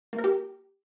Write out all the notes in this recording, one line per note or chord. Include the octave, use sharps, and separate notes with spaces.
A#3
A#4
G4